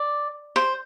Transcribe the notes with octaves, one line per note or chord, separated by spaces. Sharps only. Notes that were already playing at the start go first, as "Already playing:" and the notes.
Already playing: D5
C5